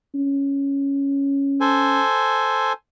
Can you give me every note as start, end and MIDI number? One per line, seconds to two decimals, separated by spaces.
0.15 2.02 61
1.60 2.73 69
1.60 2.73 72
1.60 2.73 80